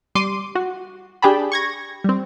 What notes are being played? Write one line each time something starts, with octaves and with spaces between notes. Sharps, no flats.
G3 C6 D6 C7 D#7
F#4
D4 G4 G#4 G5 A5 B5
C#6 G#6 A#6
G3 C4